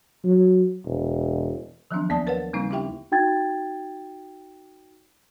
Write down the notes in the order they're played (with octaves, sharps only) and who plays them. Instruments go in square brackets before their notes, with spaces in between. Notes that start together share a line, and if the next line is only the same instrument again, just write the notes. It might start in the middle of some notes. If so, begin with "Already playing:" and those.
[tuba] F#3
E1
[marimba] D#3 F3 F#3 B3 C4 D4
D#2 A#3 B3 D5 A5 D#6
A#4 B4 C#5 F5 F#5
C#3 G3 A#3 C4 D#4
C#4 D#4 E4 G4 E5 G5
[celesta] D#4 F#4 G5 G#6 A6